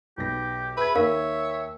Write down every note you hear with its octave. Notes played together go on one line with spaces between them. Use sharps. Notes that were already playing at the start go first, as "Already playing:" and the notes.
B1 B3 G4 A#6
G#4 B4 E5 B5 G#6
D#2 A#4 C#5 F5